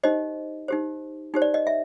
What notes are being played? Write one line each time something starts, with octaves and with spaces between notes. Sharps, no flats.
D#4 G4 C5 D#5
D#4 G4 C5
D#4 G4 C5
D5
D#5
E5